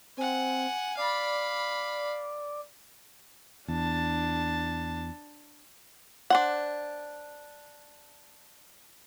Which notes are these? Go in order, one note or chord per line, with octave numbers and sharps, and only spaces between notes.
C4 F#5 G#5
D5 F5 B5
E2 D4 A5
D4 C5 F#5